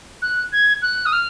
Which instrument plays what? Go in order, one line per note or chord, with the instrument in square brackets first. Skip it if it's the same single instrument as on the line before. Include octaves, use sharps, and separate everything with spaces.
[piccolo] F#6
G#6
F#6
D#6
F6